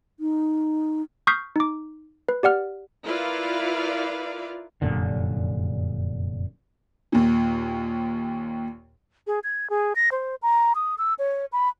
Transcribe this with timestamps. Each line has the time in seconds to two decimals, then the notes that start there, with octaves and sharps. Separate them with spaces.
0.20 D#4
1.27 C#6 D#6 F6 G6 B6 C7
1.56 D#4 D6
2.29 B4
2.43 G4 D5 F#5 F6
3.05 E4 F4 A#4 B4 D5 F5
4.82 F1 F#2 A#2 D3
7.12 D#2 A#2
9.27 G#4
9.44 G#6
9.70 G#4
9.95 A#6
10.12 C5
10.42 A#5
10.75 D#6
10.98 E6
11.19 C#5
11.52 B5